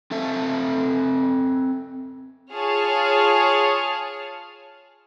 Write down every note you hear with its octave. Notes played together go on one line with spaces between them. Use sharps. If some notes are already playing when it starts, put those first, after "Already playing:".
C4 A4 E5
F4 G#4 C#5 A5 F6